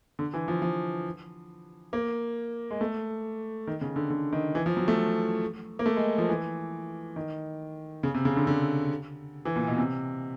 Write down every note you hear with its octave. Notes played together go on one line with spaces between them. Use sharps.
D3
E3
F3
F3
A#3
G#3
A3
D#3
C#3
D3
D3
D#3
E3
F3
F#3
A3
A#3
A3
G#3
F3
E3
D#3
C#3
C3
C#3
D3
D3
E3
A#2
B2
C3